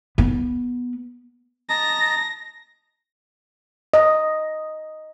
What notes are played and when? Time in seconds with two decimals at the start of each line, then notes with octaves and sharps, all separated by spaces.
0.18 B3
1.69 D#5 A5 A#5 A#6
3.94 D#5